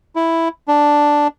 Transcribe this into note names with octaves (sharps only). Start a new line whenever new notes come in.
E4
D4